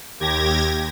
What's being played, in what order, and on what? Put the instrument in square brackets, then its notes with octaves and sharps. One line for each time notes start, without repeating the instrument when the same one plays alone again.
[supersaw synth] D#2 G4 G#6 A#6